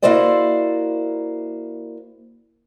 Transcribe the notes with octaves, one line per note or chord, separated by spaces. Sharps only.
A#3 E4 F#4 C5 D5 D#5